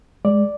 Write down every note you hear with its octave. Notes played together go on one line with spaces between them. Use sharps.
G#3 D5